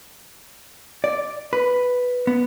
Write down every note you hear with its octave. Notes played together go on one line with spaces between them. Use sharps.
D5
B4
B3